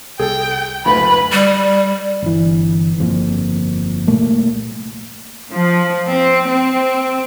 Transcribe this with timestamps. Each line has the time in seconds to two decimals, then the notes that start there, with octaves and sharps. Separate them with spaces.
0.19 C2 G#4 A4 G5
0.86 F#1 D2 B4 B5
1.32 G3
2.22 G1 E3
2.98 G1 F2 A#2
4.07 C2 A#2 A3 A#3
5.52 F3
6.08 C4
6.48 C4